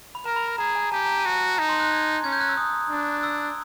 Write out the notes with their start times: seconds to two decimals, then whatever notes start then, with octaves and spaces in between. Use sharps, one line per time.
0.15 B5
0.26 A#4 A#5
0.36 B5
0.48 B5
0.58 G#4 A#5
0.75 G#5
0.92 G4 A5
1.06 A#5
1.19 A5
1.25 F#4
1.58 D#4 A#5
1.69 C6
1.80 F#6
1.91 G#6
2.24 C#4 G#6
2.32 G6
2.41 F#6
2.49 E6
2.57 D#6
2.90 D4
3.23 E6